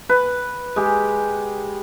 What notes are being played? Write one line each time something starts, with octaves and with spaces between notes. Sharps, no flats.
B4
G#3 G4